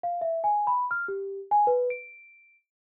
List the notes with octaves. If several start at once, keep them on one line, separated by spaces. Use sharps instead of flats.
F5
E5
G#5
B5
F6
G4
G#5
B4
D7